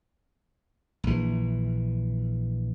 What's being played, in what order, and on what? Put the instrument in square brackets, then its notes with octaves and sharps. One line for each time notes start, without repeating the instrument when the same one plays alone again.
[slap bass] A#1 E3